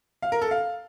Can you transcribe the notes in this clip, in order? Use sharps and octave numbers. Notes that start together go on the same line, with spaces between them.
F5
A#4
A4
F5